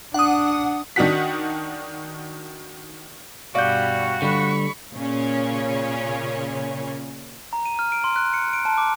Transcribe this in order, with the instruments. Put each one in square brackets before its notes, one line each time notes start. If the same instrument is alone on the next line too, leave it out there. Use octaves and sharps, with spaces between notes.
[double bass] D4 [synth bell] F#5 D#6
[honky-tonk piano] D#3 D4 D#4 F#4 F#5 B6
[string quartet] G2 B2 G3 [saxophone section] F#4 [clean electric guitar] D5 [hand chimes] F5 G6
[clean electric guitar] D3 G3 [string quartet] B5 C#6
[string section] A#2 C#3 C#4
[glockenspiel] A#5
D#7
F6
D7
C6
F#6
C#7
D7
A5
D6